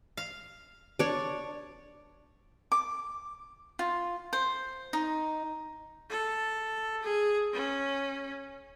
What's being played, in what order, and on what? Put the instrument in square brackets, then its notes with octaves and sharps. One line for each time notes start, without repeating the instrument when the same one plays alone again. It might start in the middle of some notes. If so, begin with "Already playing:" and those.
[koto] F5
[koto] D4 [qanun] C#5 D5
[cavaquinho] D6
F4
C5
D#4
[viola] A4
G#4
C#4